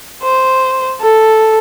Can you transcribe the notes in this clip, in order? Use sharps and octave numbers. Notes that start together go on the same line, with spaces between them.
C5
A4